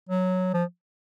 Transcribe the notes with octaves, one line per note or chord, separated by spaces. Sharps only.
F#3
F3